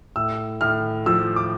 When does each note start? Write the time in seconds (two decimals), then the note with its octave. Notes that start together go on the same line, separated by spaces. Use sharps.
0.16 A2 E6
0.61 A2 F6
1.06 F3 E6
1.36 D6